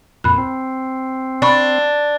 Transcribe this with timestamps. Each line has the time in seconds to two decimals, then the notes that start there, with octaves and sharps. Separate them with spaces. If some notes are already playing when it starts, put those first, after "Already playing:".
0.24 F2 A#2 B5 F#6
0.38 C4
1.42 D4 B5 C#6 A6